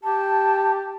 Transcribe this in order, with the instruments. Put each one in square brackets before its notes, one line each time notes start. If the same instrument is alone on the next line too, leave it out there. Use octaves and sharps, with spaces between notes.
[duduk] G4 [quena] A5